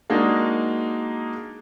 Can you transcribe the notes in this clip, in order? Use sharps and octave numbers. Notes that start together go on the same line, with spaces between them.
G#3 A#3 D4 D#4 F#4